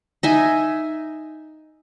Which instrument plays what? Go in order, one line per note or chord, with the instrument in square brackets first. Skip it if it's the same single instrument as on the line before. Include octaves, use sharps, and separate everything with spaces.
[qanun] D#4 E5 G#5